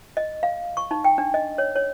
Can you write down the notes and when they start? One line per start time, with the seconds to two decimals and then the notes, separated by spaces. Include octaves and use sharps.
0.17 D#5
0.43 F5
0.77 C#6
0.91 D#4
1.04 G5
1.18 D4
1.34 D#5
1.58 C#5
1.76 C#5